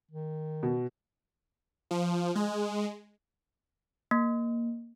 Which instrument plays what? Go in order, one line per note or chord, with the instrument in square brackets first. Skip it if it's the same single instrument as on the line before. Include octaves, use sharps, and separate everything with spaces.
[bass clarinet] D#3
[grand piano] B2
[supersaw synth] F3
G#3
[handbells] A#3